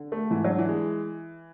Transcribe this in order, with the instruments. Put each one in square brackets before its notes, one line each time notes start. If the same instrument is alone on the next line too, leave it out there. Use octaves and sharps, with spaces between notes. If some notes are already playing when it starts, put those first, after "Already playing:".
Already playing: [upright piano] D3
[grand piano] A3
[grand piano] G#2 [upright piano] E3
[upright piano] F#3 [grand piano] D4
[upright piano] E3
[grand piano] G#3